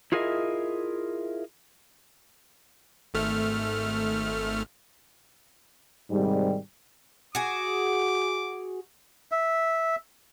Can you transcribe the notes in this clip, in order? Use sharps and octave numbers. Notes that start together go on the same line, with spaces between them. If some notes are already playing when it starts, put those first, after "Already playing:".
E4 F4 G#4 A#4 D#5 E5
G#1 A3 F6
G#2 C3 D#3 G3
F#4 G#4 D6
E5